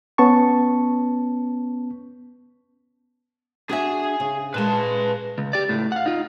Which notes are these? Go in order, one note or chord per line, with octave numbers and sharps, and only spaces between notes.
B3 C#4 A5 C#6
D4 F#4 G#4 E5 G#5
C#3
A#2 G#3 B4 A5
C#2
G4 D5
C#2 A2
F5 F#5
D#4 F4